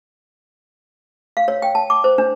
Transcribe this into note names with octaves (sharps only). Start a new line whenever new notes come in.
F5
C#5
G5
A5
D6
C5
D4